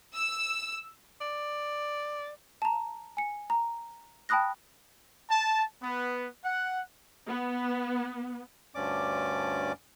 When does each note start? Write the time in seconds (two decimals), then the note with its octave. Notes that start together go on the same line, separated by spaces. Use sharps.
0.15 E6
1.21 D5
2.62 A5 A#5
3.17 G#5 C#7
3.50 A#5
4.29 G5 A5 B5 D#6 F#6 A#6
5.30 A5
5.83 B3
6.44 F#5
7.28 B3
8.75 D2 G2 C#4 D5 D6